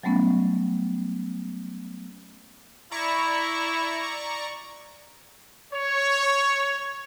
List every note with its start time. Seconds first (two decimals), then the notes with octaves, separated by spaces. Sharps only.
0.03 F#3 G3 A3 B3 C#4
2.91 E4 D5 A#5 C#6
5.74 C#5